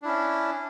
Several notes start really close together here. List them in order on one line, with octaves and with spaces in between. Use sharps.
D4 E4 C#4